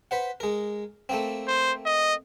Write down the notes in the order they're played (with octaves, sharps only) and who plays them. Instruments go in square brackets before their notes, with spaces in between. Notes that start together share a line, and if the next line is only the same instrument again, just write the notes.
[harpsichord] B4 C5 F#5
G#3 A#4
A3 A#3 C4
[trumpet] C5
D#5